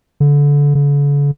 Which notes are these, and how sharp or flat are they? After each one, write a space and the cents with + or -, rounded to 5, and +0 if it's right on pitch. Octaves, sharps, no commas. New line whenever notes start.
D3 -25
D3 -45